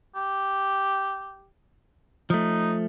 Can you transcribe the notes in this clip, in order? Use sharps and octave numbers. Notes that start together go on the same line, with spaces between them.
G4
F3 A3 D#4